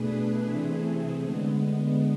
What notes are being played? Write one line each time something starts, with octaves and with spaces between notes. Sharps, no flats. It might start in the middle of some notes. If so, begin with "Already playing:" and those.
Already playing: B2 A3 D4 G#4 B4
C3 E3 A3 C4 G#4
D3 G#3 B3